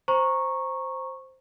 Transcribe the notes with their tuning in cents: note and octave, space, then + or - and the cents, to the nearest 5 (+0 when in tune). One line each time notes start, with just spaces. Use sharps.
C5 +0 A#5 +0 C#6 -10